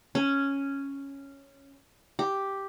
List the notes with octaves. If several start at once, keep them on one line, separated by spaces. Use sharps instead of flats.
C#4
G4